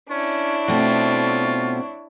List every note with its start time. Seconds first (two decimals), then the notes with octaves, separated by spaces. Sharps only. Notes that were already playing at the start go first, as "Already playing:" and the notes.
0.10 C#4 D4 E4 C#5
0.68 B2 A3 C4 F4